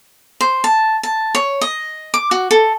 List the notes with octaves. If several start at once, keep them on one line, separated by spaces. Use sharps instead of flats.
C5
A5
A5
C#5
D#5
D6
F#4
A4